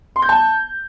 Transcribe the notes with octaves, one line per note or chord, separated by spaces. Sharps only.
C6
G6
A5